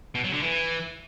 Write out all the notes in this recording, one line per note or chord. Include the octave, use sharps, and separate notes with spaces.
B2
F#3
D3
E3